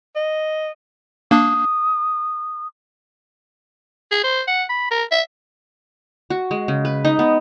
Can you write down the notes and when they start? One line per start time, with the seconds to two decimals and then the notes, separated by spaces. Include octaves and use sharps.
0.16 D#5
1.31 A#3 D4 D#6
4.11 G#4
4.24 C5
4.47 F#5
4.69 B5
4.91 A#4
5.11 E5
6.30 F#4
6.51 G#3
6.68 C#3
6.85 B4
7.05 D#4
7.19 B3